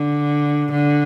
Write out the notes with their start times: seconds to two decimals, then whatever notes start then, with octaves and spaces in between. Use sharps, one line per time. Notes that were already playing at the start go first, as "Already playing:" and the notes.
Already playing: D3
0.72 D3